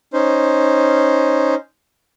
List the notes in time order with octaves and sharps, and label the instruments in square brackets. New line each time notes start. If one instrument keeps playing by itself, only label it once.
[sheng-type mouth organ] C#4 D#4 C5